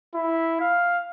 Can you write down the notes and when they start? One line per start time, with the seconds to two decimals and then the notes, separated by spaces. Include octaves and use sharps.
0.14 E4
0.60 F5